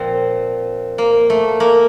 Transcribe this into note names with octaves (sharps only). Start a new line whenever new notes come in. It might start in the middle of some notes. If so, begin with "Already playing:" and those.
Already playing: A#2 F3 C4
A#3
A3
A#3